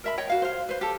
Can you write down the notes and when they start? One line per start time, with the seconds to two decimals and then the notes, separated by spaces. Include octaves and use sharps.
0.04 A#4 E5 B5
0.18 C#5 D#5 G5
0.29 F#4 F5
0.42 C5 F5
0.69 B4 C5
0.81 G4 A4